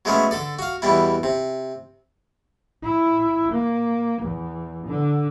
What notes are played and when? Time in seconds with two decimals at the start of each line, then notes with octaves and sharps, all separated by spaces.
0.05 F#3 G#3 A3 B3 C#4
0.31 D3 A4 D5
0.59 F#4 F5
0.82 E2 B2 G3 E4
1.23 C3
2.83 E4
3.52 A#3
4.22 E2
4.87 D3